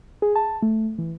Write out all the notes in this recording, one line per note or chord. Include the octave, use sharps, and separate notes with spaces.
G#4
A5
A3
E3